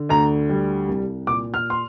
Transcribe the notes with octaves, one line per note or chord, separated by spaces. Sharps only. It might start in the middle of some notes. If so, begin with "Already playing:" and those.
Already playing: D3
D2 A#5
G3
C2
A#2 D6
F6
C6